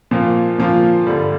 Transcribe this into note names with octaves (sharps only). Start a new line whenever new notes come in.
A#2 F3 A#3 F4
A#2 F3 A#3 F4
G2 D3 G3